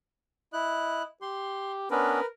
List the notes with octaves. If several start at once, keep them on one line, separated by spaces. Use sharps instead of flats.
E4 D#5 F#6
G4 C6
B3 C#4 D4 A#4 B4